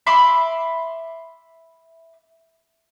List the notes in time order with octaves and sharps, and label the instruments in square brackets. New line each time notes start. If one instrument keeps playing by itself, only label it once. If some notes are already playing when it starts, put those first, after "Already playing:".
[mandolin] E5 B5 C6 D6